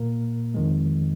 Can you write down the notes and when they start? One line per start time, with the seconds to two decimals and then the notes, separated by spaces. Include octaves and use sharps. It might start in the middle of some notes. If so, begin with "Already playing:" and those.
Already playing: A#2 A#3 A#4
0.54 F2 D#3 G#3